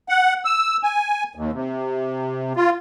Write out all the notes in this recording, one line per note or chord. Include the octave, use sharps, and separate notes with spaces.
F#5
E6
G#5
D#2
C3
F4